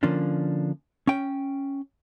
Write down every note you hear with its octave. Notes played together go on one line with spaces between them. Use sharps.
D3 F3 A#3 C#4 D4
C#4 G5